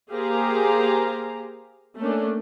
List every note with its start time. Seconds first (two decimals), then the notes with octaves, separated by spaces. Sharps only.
0.10 A#3 G4 G#4 C5 F5 A#5
1.98 A3 A#3 C#4 D4